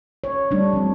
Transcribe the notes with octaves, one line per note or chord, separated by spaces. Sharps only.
C#5
G3 A3 D4
F3 C4